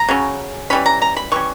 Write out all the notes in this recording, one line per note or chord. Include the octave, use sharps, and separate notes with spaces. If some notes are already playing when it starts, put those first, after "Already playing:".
Already playing: A#5
C#3 F#3 C#4
E3 G3 C#4 B5
A#5
A#5
B5
E3 G3 C#4 C#6